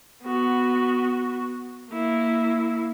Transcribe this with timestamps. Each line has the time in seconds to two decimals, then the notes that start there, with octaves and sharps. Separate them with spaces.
0.24 B3 F#4
1.91 A#3 E4